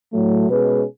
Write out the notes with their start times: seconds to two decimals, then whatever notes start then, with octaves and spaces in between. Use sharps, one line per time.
0.13 A2 F#3 A3
0.48 B2 G#3 C#4 G#4 B4